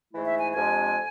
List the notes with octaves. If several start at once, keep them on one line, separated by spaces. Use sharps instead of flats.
G#2 E3 A3 E4
E5
G#5
F2 C3 G#3 D4 G#5